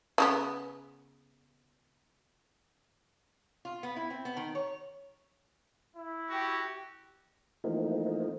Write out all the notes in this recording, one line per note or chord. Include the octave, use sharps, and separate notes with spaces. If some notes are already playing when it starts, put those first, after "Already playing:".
C#3 F3 B3
F4
B3
E4
C4
B3
D#3
C#5
E4
F#4 G4
E3 F3 A3 A#3 C4 D#4